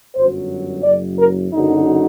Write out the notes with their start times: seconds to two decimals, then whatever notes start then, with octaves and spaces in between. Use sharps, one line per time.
0.15 G1 F#2 F#3 C5
0.83 F#1 F#2 F#3 D5
1.18 A#4
1.51 F#1 F#2 D3 F#3 D#4